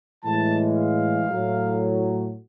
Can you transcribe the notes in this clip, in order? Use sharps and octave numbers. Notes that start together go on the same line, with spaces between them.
A2 E3 G#3 A5
F5
A2 F#3 A3